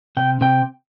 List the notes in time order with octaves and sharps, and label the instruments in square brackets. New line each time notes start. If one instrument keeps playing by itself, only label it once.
[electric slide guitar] C3 G5
C3 G5